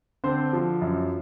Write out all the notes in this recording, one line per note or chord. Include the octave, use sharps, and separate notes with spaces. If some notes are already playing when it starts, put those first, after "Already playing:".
D3 C4 C5
F3
F#2